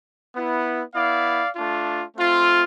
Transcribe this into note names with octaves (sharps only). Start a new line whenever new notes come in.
B3 E4
B3 E4 D5 F5
A3 D4 F4
A3 C4 F4